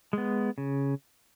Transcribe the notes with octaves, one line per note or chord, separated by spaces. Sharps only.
G#3 B3
C#3